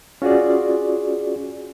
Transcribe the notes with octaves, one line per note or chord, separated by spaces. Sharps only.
C#4 F4 F#4 G#4 D5